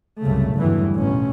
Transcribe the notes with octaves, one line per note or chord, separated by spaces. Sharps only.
C2 F#2 C#3 A3
G1 E2 G2 E3 F#3
A1 B2 C#4